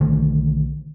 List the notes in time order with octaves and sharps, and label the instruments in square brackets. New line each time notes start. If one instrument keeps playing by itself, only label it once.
[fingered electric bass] B1 D3 D#3 A3